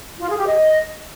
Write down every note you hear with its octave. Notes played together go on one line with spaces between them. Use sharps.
F4
G#4
G4
D#5